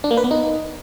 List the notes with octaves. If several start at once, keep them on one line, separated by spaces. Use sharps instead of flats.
D4
A#3
B4
B3
D#4